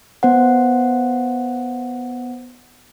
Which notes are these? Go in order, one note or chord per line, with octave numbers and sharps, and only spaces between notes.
B3 C5 F#5